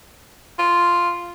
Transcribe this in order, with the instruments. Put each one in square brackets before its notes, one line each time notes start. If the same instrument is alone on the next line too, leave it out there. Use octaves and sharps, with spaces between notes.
[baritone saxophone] F4